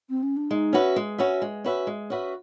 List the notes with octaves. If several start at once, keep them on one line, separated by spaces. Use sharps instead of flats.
C4
C#4
D4
G#3 D#4
C#4 F#4 B4 E5
G#3
C#4 F#4 B4 E5
G#3
C#4 F#4 B4 E5
G#3
C#4 F#4 B4 E5